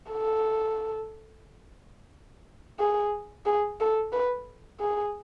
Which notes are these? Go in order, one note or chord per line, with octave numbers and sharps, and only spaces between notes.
A4
G#4
G#4
A4
B4
G#4